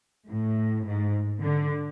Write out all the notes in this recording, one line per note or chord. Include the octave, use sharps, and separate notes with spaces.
A2
G#2
D3